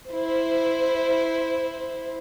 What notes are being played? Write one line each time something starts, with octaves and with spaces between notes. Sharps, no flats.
E4 C5